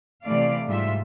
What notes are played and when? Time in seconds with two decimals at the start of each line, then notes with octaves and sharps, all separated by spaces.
0.24 C3 E3 A3 D5 F5
0.67 G#2 G3 F4 E5